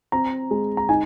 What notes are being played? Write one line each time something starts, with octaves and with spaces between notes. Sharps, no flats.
C4 A#5
G#3
A#5
D#4 G#5